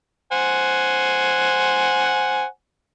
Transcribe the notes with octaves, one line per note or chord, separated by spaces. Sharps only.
C5 F#5 G#5